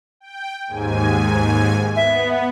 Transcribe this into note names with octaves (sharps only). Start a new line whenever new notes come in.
G5
D#2 G#2 G#5
B3 E5